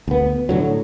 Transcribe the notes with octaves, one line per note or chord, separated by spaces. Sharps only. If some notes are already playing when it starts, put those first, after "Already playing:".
D2 B3
A2 D3 F#3